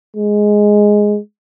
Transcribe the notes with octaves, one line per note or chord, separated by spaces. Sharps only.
G#3